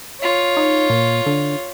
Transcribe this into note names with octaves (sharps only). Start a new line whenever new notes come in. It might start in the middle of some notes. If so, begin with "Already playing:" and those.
F4 C#5
D#4
A#2
D3